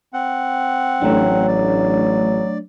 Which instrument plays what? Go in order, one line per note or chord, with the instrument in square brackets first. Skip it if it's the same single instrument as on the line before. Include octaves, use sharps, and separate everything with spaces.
[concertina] C4 F#5
[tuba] A1 [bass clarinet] F#3 [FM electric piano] A3 D4
[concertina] D5